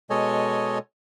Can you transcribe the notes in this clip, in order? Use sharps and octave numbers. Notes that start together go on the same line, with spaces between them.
B2 G#3 A4 C#5 D#5 G#5